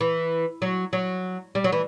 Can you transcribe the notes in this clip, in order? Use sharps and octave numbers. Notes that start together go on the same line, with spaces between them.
E3
F#3
F#3
G3
F#3
E3